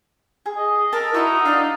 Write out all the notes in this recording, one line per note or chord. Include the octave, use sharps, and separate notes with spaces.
G#4
D#5
A4 A#4
D#4 E4 F#4
D4 F5